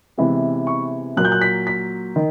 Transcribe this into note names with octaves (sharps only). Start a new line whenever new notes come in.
C3 E3 G#3 B3
C#6
A#2 F#3 A#3 F#6
G6
F#6
B6
B6
D#3